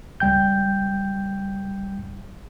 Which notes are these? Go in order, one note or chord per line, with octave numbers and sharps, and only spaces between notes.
C#2 G3 G5 G6